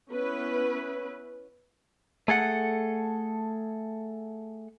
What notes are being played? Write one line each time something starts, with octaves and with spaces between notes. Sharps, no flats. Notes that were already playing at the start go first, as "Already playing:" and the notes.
B3 C#4 E4 B4
A3 G#4 A4 F#5